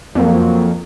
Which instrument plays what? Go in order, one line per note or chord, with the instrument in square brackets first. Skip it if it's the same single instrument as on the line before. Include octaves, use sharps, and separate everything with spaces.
[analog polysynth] F2 [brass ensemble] F#3 A#3